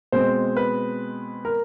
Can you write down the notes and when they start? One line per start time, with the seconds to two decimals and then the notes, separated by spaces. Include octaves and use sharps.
0.12 B2 G#3 C4 C5
0.57 B4
1.45 A#4